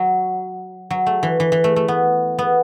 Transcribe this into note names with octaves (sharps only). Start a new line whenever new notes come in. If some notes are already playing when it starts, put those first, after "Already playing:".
Already playing: F#3
F#3
A3
E3
E3
E3
A3
A3
B3
B3